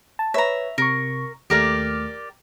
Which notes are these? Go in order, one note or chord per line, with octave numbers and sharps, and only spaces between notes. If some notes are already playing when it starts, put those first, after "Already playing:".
A5
B4 C#5 E5 A#5
C3 A#4 C#6
D#2 A3 G4 A#4 D5 F6